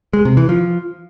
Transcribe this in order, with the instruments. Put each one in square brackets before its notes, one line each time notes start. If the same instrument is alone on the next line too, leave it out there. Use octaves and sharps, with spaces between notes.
[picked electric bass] G#3
C3
E3
F3